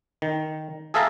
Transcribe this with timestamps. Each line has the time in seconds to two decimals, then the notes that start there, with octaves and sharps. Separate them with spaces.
0.22 D#3
0.94 G#4 A4 E5 F5 A5 A#5